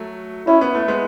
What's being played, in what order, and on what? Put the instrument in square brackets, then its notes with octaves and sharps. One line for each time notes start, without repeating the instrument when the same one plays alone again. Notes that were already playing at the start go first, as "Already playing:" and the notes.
Already playing: [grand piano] F#3 A3
[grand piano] C#4 [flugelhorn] E4
[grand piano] B3
A3
G#3 B3